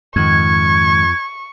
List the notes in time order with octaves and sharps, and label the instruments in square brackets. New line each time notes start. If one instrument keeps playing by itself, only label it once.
[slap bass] F2 [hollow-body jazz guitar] G#2 D#3 [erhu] C#6 [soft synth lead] G#6